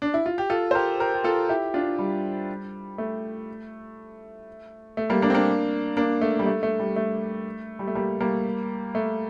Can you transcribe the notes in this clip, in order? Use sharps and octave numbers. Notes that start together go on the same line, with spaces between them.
D4
E4
F4
G4
F4 A4
C5
G4 A#4
G4 A#4
G4
F4 A4
E4 G4
D4 F4
G3
A3
A3
G3 A#3
A#3 D4
C4
A#3 D4
A#3 D4
A3
G3
A3
A3
G3
A3
G3
A3
G3 A#3
G3 A#3
A3